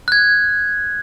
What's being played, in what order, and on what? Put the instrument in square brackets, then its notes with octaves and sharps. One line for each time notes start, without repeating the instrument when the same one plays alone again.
[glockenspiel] F#6 G#6